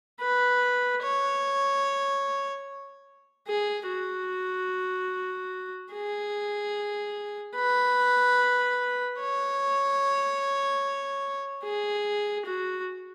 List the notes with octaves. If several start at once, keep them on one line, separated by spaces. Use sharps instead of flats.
B4
C#5
G#4
F#4
G#4
B4
C#5
G#4
F#4